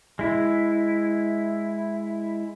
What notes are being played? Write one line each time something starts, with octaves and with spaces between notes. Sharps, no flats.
G#3 E4